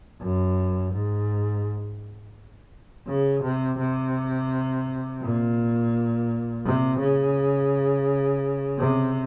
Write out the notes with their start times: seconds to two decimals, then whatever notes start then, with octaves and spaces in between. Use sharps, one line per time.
0.21 F#2
0.93 G#2
3.08 C#3
3.43 C3
3.79 C3
5.22 A#2
6.65 C3
6.99 C#3
8.78 C3